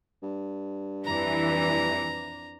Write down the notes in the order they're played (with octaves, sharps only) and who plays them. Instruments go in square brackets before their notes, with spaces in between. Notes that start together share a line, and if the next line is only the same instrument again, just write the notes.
[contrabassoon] G2
[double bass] F2 D4 [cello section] E3 [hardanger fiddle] A#5